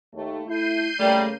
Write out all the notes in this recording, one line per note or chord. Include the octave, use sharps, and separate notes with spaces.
D#2 A3
A3 E4 G6 C7 D#7
C#3 G3 A3 A#3 A#4